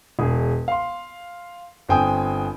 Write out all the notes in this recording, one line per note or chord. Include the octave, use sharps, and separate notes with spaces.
E1 G#4
F5 C6
G1 C4 G5 G#5 D#6